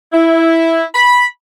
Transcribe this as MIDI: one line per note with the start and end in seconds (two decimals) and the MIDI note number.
0.13 0.83 64
0.94 1.25 83